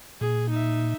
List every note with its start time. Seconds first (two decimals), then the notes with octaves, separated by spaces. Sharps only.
0.21 A#2 G#4
0.50 D#4 E5